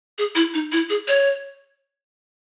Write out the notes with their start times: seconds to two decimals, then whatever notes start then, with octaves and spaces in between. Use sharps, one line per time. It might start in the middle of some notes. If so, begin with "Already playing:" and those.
0.18 G#4
0.35 E4
0.54 D#4
0.72 E4
0.90 G#4
1.08 C#5